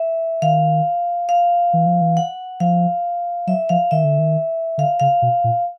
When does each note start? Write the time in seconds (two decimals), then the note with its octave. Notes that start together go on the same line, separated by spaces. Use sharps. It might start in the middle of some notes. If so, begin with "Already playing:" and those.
Already playing: E5
0.42 D#3 F5
1.29 F5
1.73 E3
1.86 F3
2.01 E3
2.17 F#5
2.60 F3 F5
3.47 F#3 E5
3.69 F3 F5
3.91 D#3 E5
4.04 D3
4.19 D#3
4.78 D3 F5
5.00 C#3 F5
5.22 B2
5.44 A#2